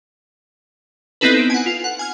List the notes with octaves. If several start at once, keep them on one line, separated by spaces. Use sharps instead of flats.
B3 C4 D#4 E4 A4 B4
B6 D7
F#5 G#5
F4
F#5
G#5 F6